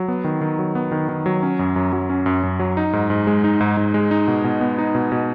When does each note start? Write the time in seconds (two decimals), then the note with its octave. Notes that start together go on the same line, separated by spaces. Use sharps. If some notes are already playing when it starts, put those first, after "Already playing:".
Already playing: F#3
0.08 B3
0.24 D#3
0.41 D#3
0.59 F#3
0.75 B3
0.92 D#3
1.09 D#3
1.26 F#3
1.42 C#4
1.59 F#2
1.76 F#2
1.93 F#3
2.09 C#4
2.26 F#2
2.43 F#2
2.60 F#3
2.77 D#4
2.93 G#2
3.10 G#2
3.27 G#3
3.44 D#4
3.61 G#2
3.77 G#2
3.94 G#3
4.11 D#4
4.28 B2
4.44 B2
4.61 B3
4.78 D#4
4.95 B2
5.12 B2